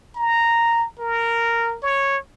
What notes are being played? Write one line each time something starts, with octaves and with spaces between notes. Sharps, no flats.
A#5
A#4
C#5